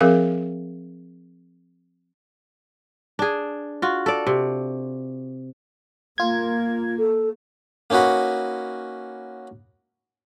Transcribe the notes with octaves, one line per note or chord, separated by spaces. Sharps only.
F3 C4 G#4 A#4 E5 F5
D4 G#4
F4 F#4
A4 D5
C3
A#3 F4 G#6
A4
A#3 C#4 D#4 F#4 B4